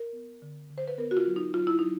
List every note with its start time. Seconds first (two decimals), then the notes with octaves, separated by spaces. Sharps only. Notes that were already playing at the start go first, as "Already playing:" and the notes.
Already playing: A#4
0.13 B3
0.42 D3
0.70 D3
0.78 C5
0.88 B4
0.98 B3 A#4
1.11 F#4
1.17 F4
1.27 F#3
1.36 D#4
1.54 F#3 F4
1.67 E4
1.79 F#3 D#4